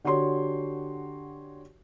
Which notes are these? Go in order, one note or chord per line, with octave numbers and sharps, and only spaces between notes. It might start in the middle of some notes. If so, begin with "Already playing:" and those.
D3 F#4 G4 C#5 C6